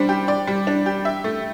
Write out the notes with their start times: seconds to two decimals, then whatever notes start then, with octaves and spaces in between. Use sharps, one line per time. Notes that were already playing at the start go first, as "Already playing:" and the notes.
Already playing: G3 D4 C5
0.09 G4
0.28 D5
0.47 G3
0.67 D4
0.86 G4
1.05 E5
1.24 A3